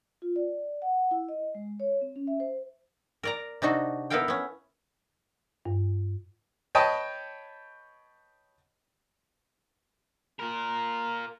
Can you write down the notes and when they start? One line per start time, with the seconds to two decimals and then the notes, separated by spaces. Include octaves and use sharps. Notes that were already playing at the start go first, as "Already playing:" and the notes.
0.22 F4
0.36 D5
0.82 F#5
1.11 E4
1.29 D#5
1.55 G#3
1.80 C#5
2.01 C4
2.16 C#4
2.27 E5
2.40 C5
3.23 A#4 D5 A#5
3.62 C3 D4 D#4 F#4
4.10 B3 E4 A4 A#4 F5 G5
4.28 B3 C#4
5.65 G2
6.75 B4 C#5 D#5 G5 A5
10.39 F4 A#4